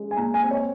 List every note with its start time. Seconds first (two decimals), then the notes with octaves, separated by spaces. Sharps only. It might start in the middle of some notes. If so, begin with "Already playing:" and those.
Already playing: G#3 C#4
0.11 G#5
0.17 A#2 A#5
0.34 G#5
0.43 C4
0.51 C#5